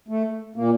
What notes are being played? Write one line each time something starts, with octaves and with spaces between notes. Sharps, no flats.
A3
A#2 A#3